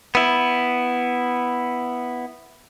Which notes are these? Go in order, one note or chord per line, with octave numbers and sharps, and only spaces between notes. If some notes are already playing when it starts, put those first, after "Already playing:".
B3 E4